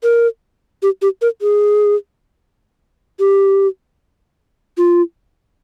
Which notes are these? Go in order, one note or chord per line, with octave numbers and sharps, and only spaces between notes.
A#4
G4
G4
A#4
G#4
G4
F4